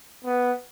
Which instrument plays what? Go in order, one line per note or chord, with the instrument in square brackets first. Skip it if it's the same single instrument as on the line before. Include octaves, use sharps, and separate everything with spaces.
[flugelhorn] B3